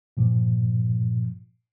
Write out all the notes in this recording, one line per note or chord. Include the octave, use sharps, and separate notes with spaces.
G2 A#2 F3